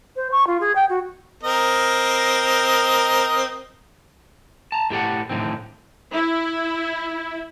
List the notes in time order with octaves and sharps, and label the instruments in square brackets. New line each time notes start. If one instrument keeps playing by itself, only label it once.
[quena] C5
C#6
F4
G#4
G5
F#4
[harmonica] C4 A#4 D#5
[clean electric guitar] A5 A#5
A2 G4 A4 F#5
A2 D3 D#3 C4
[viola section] E4